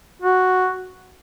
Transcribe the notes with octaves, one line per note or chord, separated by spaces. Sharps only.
F#4